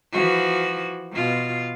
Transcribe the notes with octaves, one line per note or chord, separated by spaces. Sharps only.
E3 F3 F#4
B2 F4